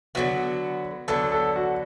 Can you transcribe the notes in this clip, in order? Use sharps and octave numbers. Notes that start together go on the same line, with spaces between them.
D3 F#3 B3 F#4
D3 F#3 B3 A4
A4
F#4